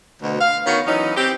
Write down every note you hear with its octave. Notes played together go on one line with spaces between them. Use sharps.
D2 B2
F5
D#3 B3 C#4 F#4 C#5
E3 F#3 C#4 D#4
C4 G4